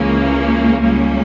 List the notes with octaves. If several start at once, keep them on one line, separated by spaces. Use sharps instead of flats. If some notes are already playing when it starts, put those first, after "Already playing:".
Already playing: C#2 C#3 E3 A#3 C#4
C#2 C#3 G3 A#3 C#4